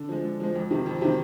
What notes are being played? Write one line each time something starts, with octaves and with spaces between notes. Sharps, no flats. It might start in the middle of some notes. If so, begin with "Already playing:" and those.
Already playing: D3
F3 G#3
D3
F3 G#3
F2
C3 D#3
F2
C3 D#3